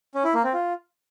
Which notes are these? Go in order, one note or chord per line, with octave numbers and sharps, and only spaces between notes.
C#4
E4
A#3
C4
F4